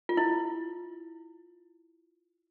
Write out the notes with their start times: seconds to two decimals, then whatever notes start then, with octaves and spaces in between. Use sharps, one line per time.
0.09 F4
0.17 E4